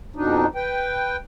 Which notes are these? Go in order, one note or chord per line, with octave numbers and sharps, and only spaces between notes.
F2 B2 D4 D#4
B4 G5